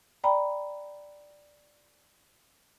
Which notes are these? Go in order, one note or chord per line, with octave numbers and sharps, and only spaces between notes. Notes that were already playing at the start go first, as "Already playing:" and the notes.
D5 G5 A#5 B5